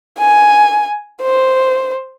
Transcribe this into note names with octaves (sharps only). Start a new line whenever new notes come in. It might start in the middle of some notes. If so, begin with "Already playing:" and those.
G#5
C5